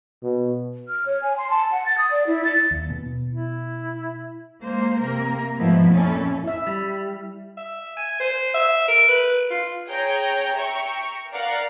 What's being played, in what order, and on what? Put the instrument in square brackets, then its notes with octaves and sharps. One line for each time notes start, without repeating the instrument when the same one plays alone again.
[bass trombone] B2
[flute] F6
C#5
G#5
C6
A5
F#5
A6
D#6
D5
E4
A6
[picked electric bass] D#2
B2
[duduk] E4
[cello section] G#3 A#3 C5
C3 A#3 A#4
G#2 B2 F3 A3 B3 E4
F2 A#2 C#4 E4 A4
[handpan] E4 E5
[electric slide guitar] G3
[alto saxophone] E5
G#5
C5
E5
A#4
B4
F4
[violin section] G#4 C#5 G5 A#5
E5 G5 A#5 C#6
A#4 D5 F5 F#5